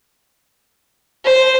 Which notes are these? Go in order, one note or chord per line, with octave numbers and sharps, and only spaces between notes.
C5